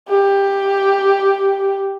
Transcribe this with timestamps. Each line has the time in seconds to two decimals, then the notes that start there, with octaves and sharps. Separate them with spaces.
0.09 G4